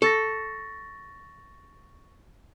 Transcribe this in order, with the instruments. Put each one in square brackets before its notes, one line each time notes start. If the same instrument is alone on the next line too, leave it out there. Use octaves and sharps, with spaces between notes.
[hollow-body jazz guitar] A4 [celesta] C#6 A6 A#6